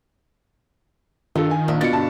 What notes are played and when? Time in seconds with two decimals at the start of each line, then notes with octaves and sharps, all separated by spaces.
1.36 G2 D#3 F4 A4
1.51 G#5
1.68 A#1 D4
1.81 B2 F4 D6 A6 C#7
1.93 G2 D3 A5